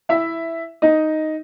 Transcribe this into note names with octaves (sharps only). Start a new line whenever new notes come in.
E4 E5
D#4 D#5